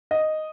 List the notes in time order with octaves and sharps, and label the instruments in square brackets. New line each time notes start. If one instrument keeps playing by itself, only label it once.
[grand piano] D#5